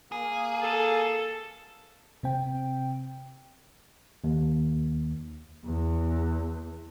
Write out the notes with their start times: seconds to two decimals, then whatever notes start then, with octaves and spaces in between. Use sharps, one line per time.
0.12 A#3 G#4
0.61 A4
2.23 C3 C4 G5
4.24 D#2
5.65 E2